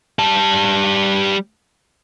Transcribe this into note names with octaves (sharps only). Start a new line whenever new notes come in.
G3 A5